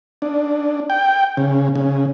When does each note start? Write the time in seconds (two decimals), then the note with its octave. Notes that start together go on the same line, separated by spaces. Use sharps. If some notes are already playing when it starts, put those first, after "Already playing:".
0.22 D4
0.90 G5
1.37 C#3
1.75 C#3